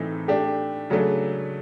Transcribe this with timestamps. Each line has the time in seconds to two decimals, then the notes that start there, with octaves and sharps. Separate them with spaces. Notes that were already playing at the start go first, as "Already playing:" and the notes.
Already playing: A2 E3 A3 C4 D#4
0.28 A3 D4 G4
0.90 C#3 F#3 A3 D4